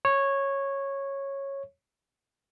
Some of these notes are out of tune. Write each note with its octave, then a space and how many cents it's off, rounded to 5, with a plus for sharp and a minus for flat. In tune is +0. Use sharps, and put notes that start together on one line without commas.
C#5 -10